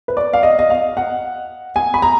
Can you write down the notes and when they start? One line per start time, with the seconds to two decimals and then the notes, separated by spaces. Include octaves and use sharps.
0.08 B4
0.17 D5
0.33 F5
0.43 D#5
0.59 D#5
0.70 F5
0.97 F#5
1.76 G#5
1.94 B5
2.02 A#5